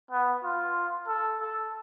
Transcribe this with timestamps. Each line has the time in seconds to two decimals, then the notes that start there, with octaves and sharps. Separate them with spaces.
0.11 B3
0.43 F4
1.08 A4
1.41 A4